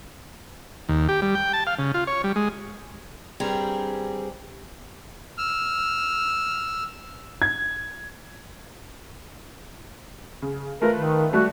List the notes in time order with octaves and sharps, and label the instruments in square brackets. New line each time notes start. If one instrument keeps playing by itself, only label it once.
[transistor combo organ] D#2
G4
G3
G5
A5
F5
C#3
F4
C#5
G3
G#3
[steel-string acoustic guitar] G2 G3 C4 G#4 A#5
[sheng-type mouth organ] E6 F6
[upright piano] G#6
[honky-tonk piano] C#3
[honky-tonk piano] A3 F4 B4 [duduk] A#4
[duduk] D#3
[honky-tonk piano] G3 A3 [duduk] F#4